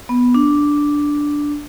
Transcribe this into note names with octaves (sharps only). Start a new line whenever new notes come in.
B3
D4